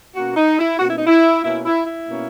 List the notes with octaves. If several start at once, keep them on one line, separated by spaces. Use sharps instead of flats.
B2 A#3 C#4 F#4
D#4
E4
B2 A#3 C#4 F#4
E4
D#4
E4
B2 A#3 C#4 E4
E4
E4
B2 A#3 C#4